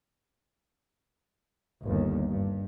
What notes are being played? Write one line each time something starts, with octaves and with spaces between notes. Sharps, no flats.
G1 D#2
G2